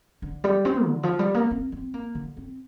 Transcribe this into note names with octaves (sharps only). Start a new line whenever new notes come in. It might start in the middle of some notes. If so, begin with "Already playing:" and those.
D3
G3
C4
D3
F3
G3
A#3
C4
C4
A#3
D3
C4